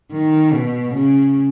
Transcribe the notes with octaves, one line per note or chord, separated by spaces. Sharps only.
D#3
B2
C#3